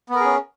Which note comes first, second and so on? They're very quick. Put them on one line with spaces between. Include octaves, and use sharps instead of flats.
B3 A#4 G#4 C#4